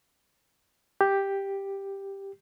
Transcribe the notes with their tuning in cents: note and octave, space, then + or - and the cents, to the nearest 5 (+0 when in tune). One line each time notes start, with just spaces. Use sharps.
G4 +5